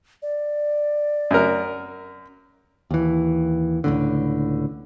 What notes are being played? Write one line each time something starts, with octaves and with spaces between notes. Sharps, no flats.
D5
F#2 A#4
D#2 E3
C#2 A2 D3